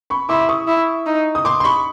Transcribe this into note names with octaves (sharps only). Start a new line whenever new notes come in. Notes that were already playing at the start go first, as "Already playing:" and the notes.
B5 C#6
E4 C6 D6
D6
C#6 D#6
E4
D#4
D#6
C6 D6
C6
B5 C#6